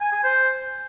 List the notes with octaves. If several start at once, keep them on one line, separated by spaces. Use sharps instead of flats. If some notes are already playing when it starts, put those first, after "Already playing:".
G#5
G#5
C5